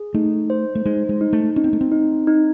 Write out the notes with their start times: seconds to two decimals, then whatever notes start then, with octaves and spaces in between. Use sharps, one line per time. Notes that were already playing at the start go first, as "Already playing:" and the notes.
Already playing: G#4
0.14 A3 D#4
0.50 C5
0.75 A3
0.85 G#3 D#4
1.09 G#3
1.21 D#4
1.33 A3
1.56 C#4 D#4
1.64 C4
1.73 A3
1.81 C4
1.92 D#4
2.27 D#4